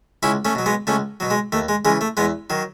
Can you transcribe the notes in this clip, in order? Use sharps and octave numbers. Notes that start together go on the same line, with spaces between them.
C#2 C#4 E4
A3 C#4
B2 F#3
G#3 B3
C#2 A3 C#4
B2 F#3
G#3
D#2 A3
G#3
C#3 E3 G#3
A3
E2 G#3 B3
D#3 F#3